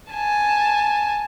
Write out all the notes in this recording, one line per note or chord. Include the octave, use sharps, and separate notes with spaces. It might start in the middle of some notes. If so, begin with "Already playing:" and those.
G#5 A5